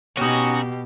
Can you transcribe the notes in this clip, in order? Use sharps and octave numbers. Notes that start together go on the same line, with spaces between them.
B2 C#4 D#4 F#4 G4